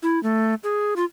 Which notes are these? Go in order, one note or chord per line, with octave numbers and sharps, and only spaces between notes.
E4
A3
G#4
F4